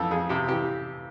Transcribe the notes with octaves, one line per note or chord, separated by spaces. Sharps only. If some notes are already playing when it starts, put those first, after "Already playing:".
Already playing: F2 E3 A4
F2 G#4
C3 G4
E3 G4